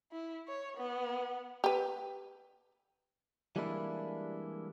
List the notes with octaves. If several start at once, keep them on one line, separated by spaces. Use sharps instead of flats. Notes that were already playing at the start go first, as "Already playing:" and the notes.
E4
C#5
B3
G4 B4
E3 G3 G#3 A#3 D4 E4